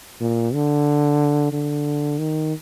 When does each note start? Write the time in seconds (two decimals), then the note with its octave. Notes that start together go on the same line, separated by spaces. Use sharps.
0.21 A#2
0.54 D3
1.53 D3
2.19 D#3